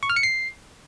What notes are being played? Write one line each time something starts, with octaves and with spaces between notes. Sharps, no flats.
C#6
F6
C#7
C7